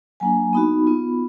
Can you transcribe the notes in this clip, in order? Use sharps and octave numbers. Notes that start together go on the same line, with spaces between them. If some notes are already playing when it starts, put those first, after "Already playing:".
F#3 A#3 D4 G#5
B3 D#4 F#4 B5
B3 F4